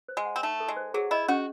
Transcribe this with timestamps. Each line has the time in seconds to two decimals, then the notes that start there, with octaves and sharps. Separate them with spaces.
0.08 C5
0.17 G#3
0.25 F#5
0.36 C4
0.43 A3 D#4
0.60 A4
0.68 G#3
0.76 C5
0.94 F#3 G#4
1.11 E4 D#5
1.28 C#4 F#4